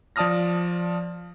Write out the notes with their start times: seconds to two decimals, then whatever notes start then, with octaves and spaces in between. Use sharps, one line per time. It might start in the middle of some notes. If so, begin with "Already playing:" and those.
0.16 F3 D5 A5 D#6 F6 A#6